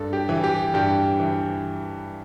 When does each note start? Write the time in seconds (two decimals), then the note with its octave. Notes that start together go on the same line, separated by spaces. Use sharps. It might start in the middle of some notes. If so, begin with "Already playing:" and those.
Already playing: G2 A4
0.13 G4
0.29 E3
0.44 G4
0.74 G2 G4
1.20 E3